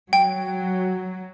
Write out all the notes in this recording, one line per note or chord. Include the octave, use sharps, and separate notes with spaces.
F#3 G5